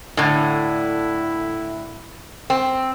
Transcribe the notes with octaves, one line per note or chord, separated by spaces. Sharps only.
A2 D3 E4
C4